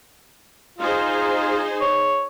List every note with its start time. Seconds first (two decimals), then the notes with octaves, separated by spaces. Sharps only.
0.79 D#4 F4 G#4 C5
1.81 C#5